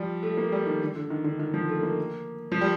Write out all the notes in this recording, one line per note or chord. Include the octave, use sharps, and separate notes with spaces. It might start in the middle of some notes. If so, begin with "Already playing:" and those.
Already playing: F3 G3
A3
A#3
G3
D#3
D3
D3
D#3
D3
D#3
F3
A3
A#3
F3
G3